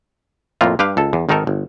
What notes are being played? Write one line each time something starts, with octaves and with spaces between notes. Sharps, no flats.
F2 A2 A3 A#3 F4
G2 G4 B4 F5
C#2 A4
E2
G#1 D#3 D#4 A4 A#4
G1